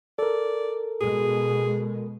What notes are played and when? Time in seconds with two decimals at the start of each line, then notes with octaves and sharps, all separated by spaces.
0.19 A4 A#4 D5
1.01 B2 G#3 G#4